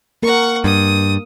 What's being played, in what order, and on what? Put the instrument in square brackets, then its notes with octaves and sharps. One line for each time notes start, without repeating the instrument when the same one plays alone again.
[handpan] A#3 A#4 [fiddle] F#5 C#6
[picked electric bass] G2 [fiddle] D#6